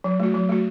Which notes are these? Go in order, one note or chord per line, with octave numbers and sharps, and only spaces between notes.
F#3
A3 F#4
F#3
A3 F#4